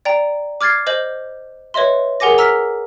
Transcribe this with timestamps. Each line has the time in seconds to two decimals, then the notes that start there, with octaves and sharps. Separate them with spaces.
0.05 D5 G5 A#5
0.61 D6 F6 G#6 A6 C7
0.87 C5 D#5 G6 F#7
1.74 B4 C#5 D#5 E5 C6
2.20 G#4 A#4 F#5 G#5 D6 A#6
2.38 A#5 E6 F6 B6